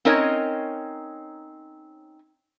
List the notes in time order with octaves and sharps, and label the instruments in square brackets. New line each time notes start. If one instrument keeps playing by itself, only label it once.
[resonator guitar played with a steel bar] C4 C#4 D#4 A#4 C#5 D#5